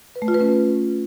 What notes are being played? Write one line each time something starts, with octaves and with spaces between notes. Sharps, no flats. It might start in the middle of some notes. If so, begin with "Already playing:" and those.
B4
A3
F4
B4
C#4